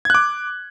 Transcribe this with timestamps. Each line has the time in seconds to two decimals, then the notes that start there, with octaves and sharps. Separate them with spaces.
0.05 G#6
0.10 F#6
0.15 D6